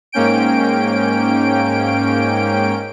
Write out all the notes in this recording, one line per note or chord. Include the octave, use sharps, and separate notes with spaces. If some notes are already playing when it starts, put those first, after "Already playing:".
G#2 A#3 C#4 G5 D7